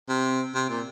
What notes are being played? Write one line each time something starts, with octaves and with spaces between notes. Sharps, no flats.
C3
C3
A#2